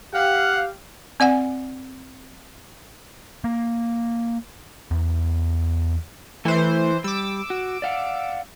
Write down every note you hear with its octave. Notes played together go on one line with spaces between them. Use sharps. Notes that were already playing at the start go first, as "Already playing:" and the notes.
G4 F5 F#5
C4 D5 F#5 G#5
A#3
E2
E3 A3 C5
G3 D6 E6
F#4
D5 F5 F#5